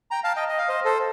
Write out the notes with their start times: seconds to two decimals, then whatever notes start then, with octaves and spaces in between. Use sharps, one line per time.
0.11 G5 A#5
0.24 F5 A5
0.36 D#5 G5
0.49 D#5
0.59 F5
0.68 C5 D#5
0.85 A4 C5